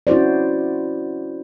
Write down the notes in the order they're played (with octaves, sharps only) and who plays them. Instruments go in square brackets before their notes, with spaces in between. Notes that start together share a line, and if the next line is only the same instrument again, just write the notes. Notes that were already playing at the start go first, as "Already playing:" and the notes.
[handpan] C#4 E4 F#4 C5 D5